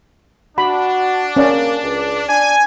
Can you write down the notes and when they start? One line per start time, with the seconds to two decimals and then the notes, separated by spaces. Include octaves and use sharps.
0.58 D4 F#4 B5
1.36 A#3 C#4 D5
1.84 C#2
2.29 D4 G#5